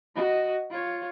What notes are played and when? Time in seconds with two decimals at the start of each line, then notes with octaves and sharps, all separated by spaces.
0.15 F#4 D#5
0.70 F4 C#5